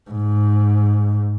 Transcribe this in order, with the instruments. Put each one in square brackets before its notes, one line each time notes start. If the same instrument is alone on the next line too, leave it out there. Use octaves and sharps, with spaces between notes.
[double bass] G#2